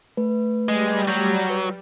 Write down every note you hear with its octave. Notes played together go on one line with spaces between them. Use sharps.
A3 B4
G3 G#3
F#3 G6
B4